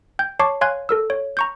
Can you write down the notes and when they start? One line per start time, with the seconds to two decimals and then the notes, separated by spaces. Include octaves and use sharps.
0.19 G5 G6
0.39 C#5 A5 C#6 D6 C7
0.61 C#5 F5 G#5 C6 F#6 G#6
0.89 A4 A#4 E6
1.10 C#5
1.37 A#5 C#6 G6